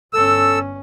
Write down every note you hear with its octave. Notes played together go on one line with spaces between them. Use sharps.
G1 C#4 A4 E6